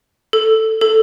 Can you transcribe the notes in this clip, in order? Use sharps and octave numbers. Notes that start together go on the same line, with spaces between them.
A4
A4